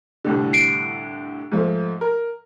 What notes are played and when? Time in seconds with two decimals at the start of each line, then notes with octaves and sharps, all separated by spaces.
0.24 C2 A2 D3
0.53 C7 D7
1.52 G#2 F3 A3
2.01 A#4